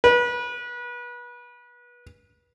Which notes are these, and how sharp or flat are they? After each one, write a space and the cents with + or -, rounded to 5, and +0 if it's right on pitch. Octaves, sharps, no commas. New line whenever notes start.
B4 -30